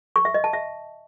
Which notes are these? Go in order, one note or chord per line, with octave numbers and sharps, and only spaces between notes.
C#6
E5
D#5
A5
E5